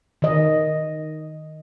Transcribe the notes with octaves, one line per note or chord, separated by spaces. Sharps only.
D#3 D#5